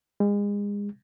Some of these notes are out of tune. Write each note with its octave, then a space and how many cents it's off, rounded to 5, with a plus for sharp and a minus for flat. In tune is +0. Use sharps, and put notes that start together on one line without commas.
G#3 -30